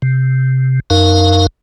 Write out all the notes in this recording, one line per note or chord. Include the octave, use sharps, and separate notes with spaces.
C3
F#2 D#4 A#4 F5